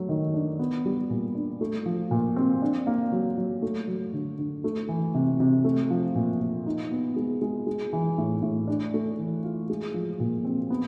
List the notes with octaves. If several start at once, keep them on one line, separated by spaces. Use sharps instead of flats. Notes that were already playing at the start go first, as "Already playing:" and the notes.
Already playing: F#3 A3
D#3
D4
B3
G3
A#2
D4
A3
F3
A#2
C4
D4
A#3
F#3
F#3
A3
F#3
D3
D3
A3
E3
C3
C3
A3
F3
A#2
A#2
D#4
B3
G#3
G#3
G#3
E3
A2
A2
D4
A3
E3
F4
G#3
F3
A#2
C4
B3